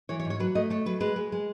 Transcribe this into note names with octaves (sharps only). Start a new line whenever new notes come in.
E3 C#5
C#5
G#2
C#5
F#3 B4
A3 D#5
A3 C#5
F#3 B4
G#3 B4
G#3
G#3